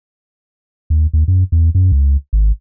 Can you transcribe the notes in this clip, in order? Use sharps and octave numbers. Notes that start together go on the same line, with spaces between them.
D#2
D#2
F#2
E2
F#2
C#2
G#1